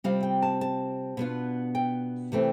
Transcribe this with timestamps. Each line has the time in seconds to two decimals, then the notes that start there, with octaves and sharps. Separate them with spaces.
0.04 C3 G3 C4 F4 F5
0.23 G5
0.42 A5
0.61 A5
1.17 B2 B3 D4 F4
1.75 G5
2.32 C3 E3 A3 C4